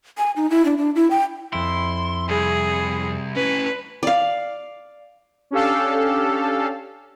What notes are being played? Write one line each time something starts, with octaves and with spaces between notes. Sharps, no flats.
G#5
D#4
E4
D4
D4
E4
G5
F2 E4 C6
C2 G#4
C#4 E4 B4
D5 F5
C#4 D4 G4 A4 F5